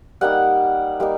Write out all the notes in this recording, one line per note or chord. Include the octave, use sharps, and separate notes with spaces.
G3 A#3 D#4 F#5
G3 A#3 D#4